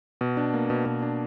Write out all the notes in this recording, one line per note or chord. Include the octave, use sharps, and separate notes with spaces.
B2
D4
A#3
B2
B2
D4